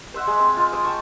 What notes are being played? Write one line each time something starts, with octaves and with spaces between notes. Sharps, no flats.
C5 E5 F#5
G#3
C4
F4
C5 D6 D#6
G5 A5 C#6